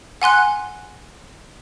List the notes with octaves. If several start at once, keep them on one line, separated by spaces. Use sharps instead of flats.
F#5 G#5 C6 F#6